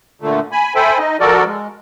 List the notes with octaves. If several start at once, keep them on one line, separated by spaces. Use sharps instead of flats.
A#2 D3 A3
G#5 B5
A4 C5 E5 G5 G#5 B5
D#4 D#5
F3 F#4 A4 A#4 D5
G#3